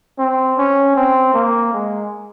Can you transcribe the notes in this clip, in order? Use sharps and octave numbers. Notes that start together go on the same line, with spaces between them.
C4
C#4
C4
A#3
G#3